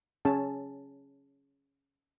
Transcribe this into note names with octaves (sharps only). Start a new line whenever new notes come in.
C#4 G#4 A5